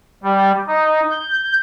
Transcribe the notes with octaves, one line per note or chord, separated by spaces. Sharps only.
G3
D#4
G6